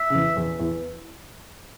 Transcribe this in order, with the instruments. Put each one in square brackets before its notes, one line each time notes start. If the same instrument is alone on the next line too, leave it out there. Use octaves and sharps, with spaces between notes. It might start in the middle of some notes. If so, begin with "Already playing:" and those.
Already playing: [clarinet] E5
[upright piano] C#3
E2 E3
E2 E3
E2 E3